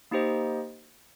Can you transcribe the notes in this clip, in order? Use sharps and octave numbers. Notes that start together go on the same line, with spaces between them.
A#3 D#4 G4 C5 D#5